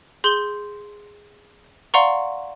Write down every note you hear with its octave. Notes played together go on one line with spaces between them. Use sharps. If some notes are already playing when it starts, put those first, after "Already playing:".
G#4 C6 G6 F#7 G7
D5 F5 F#5 A#5 C6 C#6